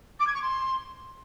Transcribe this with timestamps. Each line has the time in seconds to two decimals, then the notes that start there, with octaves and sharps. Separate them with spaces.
0.19 D6
0.26 G#6
0.34 C#6
0.41 C6